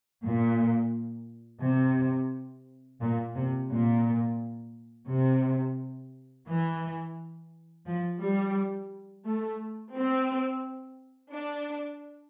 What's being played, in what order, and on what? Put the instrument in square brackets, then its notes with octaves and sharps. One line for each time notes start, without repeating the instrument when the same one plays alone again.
[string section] A#2
C3
A#2
C3
A#2
C3
E3
F3
G3
A3
C4
D4